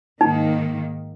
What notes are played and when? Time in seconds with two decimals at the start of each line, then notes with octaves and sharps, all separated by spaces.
0.21 G#2 D#3 A#3 D#4